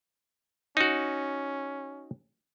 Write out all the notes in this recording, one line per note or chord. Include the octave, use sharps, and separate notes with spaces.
C#4 D#4 F#4